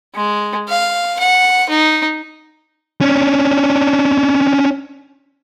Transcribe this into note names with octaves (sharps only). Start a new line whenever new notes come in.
G#3
F5
F#5
D#4
C#4 D4